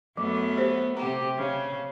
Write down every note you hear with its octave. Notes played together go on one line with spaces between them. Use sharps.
F#2 F#3 A3 B3
F#3 G4 C5
C3 G4 F#5 A#5
C#3